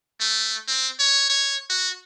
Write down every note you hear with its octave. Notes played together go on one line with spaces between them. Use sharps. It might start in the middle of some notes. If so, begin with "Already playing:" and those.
A3
C4
C#5
C#5
F#4